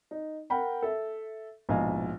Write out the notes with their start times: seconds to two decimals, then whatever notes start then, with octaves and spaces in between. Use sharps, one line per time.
0.11 D#4
0.50 A#4 F#5 G5 B5
0.82 A4 E5
1.69 A#1 G#2 B2 D#5 F5 G#5